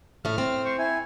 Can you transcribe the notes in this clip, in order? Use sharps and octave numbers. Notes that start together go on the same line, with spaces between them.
A2 A3 F6
C4
C5 C#6
E4 G#5